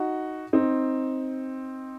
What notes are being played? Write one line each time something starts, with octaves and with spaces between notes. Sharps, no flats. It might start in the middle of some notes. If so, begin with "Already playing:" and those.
Already playing: D#4 F#4
C4 D#4